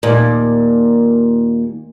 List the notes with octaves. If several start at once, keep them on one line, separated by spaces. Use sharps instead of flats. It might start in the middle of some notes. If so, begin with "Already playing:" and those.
D#2 A#2